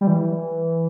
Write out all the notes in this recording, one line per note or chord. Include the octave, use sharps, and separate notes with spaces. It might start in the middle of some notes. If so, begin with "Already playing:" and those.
G3
E3